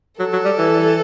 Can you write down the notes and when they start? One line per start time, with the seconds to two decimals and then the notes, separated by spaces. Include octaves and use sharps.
0.19 F#3 A4
0.33 F#3
0.45 G3
0.58 E3